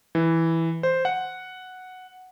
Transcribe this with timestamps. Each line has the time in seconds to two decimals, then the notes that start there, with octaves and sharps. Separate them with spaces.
0.15 E3
0.83 C5
1.05 F#5